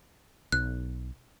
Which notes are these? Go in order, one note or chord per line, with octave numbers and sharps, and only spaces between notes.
B1 F#6